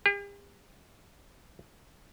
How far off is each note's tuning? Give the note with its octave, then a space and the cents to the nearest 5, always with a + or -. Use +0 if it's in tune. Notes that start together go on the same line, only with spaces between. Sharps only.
G4 +45